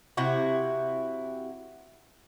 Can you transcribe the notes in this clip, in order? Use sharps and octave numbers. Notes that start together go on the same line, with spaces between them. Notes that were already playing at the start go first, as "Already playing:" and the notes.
C3 E4 F#4